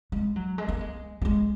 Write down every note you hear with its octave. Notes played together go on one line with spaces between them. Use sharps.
G#3
F#3
G#3
A#3
G#3
F#3
G#3